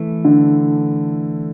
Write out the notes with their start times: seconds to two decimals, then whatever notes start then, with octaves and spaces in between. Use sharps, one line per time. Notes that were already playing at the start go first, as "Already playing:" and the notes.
Already playing: E3 A3 E4
0.25 D3